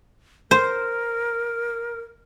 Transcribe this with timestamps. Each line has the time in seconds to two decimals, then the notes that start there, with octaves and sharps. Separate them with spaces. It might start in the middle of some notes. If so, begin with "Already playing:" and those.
0.51 A#4 C5